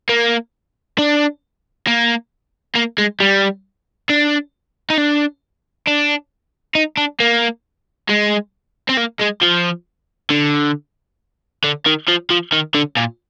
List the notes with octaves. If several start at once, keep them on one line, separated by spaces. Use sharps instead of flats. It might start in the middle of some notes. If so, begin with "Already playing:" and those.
A#3
D4
A#3
A#3
G#3
G3
D4
D#4
D4
D4
D#4
D4
A#3
G#3
C4
A#3
G#3
F3
D3
D3
D#3
F3
F3
D#3
D3
A#2